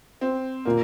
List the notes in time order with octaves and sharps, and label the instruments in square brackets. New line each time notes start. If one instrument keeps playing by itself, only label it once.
[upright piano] C4
[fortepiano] A#2 [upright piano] A#3